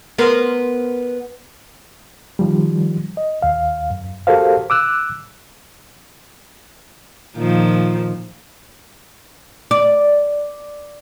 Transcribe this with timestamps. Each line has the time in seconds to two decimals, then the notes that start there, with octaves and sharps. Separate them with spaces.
0.18 B3 A#4 C5
2.39 D#3 F3 G3
3.17 D#5
3.42 D#2 F5
3.90 F#2
4.27 F#4 G4 A4 A#4 C5 F5
4.70 D6 E6 F#6
7.36 A#2 D#3 F3
9.71 D5